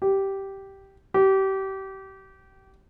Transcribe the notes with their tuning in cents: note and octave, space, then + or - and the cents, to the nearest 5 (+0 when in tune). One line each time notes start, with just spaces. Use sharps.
G4 -10
G4 -30